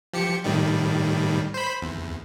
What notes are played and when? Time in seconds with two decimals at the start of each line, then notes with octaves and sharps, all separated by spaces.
0.13 F3 G4 C#7
0.44 A2 D#3 G3
1.54 C5 B5
1.82 E2